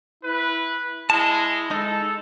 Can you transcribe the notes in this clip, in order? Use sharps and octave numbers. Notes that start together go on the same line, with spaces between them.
E4 B4
G#3 E4 A5
G#3 D#4 A4